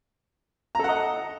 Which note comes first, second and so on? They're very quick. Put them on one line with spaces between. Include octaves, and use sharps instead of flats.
A#5 A4 F#5 D#5